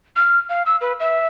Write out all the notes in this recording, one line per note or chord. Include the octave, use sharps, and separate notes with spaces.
F6
F5
E6
B4
E5